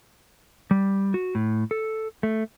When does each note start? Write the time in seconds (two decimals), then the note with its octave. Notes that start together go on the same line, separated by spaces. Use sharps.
0.71 G3
1.14 F#4
1.35 A2
1.71 A4
2.23 A3